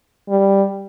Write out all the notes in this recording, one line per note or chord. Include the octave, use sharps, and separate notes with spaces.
G3